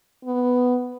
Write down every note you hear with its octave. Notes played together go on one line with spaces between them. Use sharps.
B3